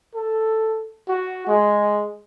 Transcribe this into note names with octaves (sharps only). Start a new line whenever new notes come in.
A4
F#4
G#3